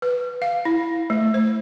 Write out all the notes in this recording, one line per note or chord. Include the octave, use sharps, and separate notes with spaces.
B4
F5
E4
A3
C5